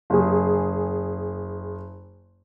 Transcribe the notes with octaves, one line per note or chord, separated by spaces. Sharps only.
F#1 G#4